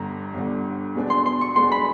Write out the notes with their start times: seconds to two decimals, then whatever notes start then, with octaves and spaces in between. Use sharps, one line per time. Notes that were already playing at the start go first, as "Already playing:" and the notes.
Already playing: G1 G2 D3 A#5
0.34 G1 G2 D3
0.95 E2 B2 G#3 B3 D4
1.10 C6
1.26 C6
1.41 C#6
1.56 E2 B2 G#3 B3 D4 C6
1.72 B5